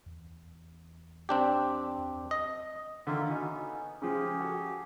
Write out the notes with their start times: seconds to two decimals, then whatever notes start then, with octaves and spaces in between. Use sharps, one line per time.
0.06 E2
1.29 C4 D4 G4
2.31 D#5
3.07 D3 D#3 A#3 F4 E5
3.29 B3 C#4 D#4 F#4
4.02 C#3 F3 G#3 G4 G#4
4.40 F#4 A4